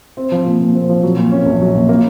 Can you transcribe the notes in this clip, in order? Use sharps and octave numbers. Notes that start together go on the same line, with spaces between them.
C4
F3
A#2
A#2
C4
F3
F#3
A#2
C#4
A#1
F#3
A#2
A#3